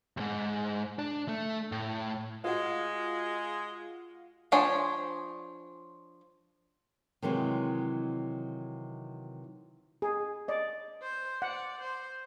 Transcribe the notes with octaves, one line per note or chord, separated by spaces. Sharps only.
D#2 G#2
D4
A3
A2
G#3 F4 F#4
F3 D4 C5 C#5 G#5
C3 D#3 E3 F#3 G#3
G#4
D5 D#5
C5
D5 F#5
C5